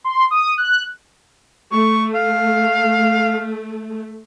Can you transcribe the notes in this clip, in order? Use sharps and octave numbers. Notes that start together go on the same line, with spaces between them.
C6
D#6
F#6
A3 C#6
F5